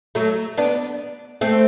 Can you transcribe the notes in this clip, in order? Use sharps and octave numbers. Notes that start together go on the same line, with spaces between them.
F#3 A3
B3 D4
A3 C4